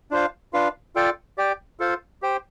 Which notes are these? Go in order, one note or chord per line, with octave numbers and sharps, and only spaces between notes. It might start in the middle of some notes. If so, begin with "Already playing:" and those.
D4 F4 C5 F5
D4 F4 B4 F5
F4 A4 D5 G5
G4 D5 G5
F4 A4 C5 F5
G4 C5 G5